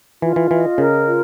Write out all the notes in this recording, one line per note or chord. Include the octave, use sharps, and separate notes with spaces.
E3 F4
E3
E3 D#5
C#3 A#4
F4